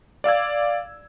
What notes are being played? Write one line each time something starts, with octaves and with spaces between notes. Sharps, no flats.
D5 F5 E6 G#6